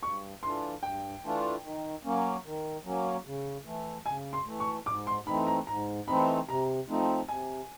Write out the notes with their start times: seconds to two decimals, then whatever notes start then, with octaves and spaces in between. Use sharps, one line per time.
0.02 G2 C#6
0.42 E3 A3 D4 F4 C6
0.82 G2 G5
1.24 E3 A3 D4 F4
1.63 D#3
2.05 F#3 A#3 C#4
2.45 D#3
2.85 F#3 A#3 C#4
3.25 C#3
3.65 E3 A3
4.06 C#3 G#5
4.33 C6
4.46 E3 A3
4.60 C#6
4.86 G#2 D6
5.07 C6
5.27 E3 A3 C4 D#4 B5
5.47 A#5
5.67 G#2 A#5
6.07 E3 A3 C4 D#4 B5
6.48 C3 A#5
6.89 F3 A3 C4 D#4
7.29 C3 G#5